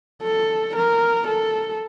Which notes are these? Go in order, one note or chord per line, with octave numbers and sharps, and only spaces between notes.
A4
A#4
A4